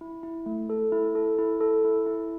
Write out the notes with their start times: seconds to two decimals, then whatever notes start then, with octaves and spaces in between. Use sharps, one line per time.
0.01 E4
0.23 E4
0.46 A3
0.70 A4
0.92 E4
1.15 A4
1.39 E4
1.61 A4
1.85 E4
2.06 E4